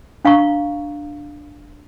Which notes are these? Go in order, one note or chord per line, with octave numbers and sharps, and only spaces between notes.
D4 F5 A#5 C#6